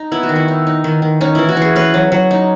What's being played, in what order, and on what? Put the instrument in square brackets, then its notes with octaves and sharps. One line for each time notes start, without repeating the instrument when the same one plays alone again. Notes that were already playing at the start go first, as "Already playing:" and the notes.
Already playing: [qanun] D#4
B3 E4
F#4
D#3
E4
D#4
D#4
D#3
D#3
C#4 D#4
E3 E4
F#4
E3 G#4
C#4 B4
F#3
F#3
D#4